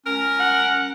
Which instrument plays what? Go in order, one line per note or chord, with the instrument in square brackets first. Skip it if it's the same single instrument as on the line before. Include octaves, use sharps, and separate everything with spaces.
[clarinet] C#4 [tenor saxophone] A#4
[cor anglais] F#5